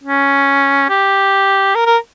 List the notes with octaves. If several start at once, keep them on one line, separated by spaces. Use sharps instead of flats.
C#4
G4
A#4
A#4